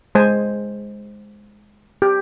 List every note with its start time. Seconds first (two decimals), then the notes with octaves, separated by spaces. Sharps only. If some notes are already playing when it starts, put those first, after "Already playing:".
0.15 G#3 C5 G#5
2.02 G4